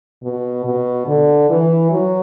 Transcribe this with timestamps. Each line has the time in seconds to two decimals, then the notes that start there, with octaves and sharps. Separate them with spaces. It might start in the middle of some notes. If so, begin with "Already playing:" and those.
0.23 B2
0.65 B2
1.07 D3
1.50 E3
1.91 F#3